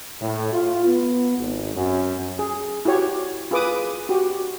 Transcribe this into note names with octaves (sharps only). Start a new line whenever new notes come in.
A2
F4
B3
G#1
F#2
G#4
E4 F#4 G4 C#5
F4 G#4 B4 D6 D#6
F#4 G4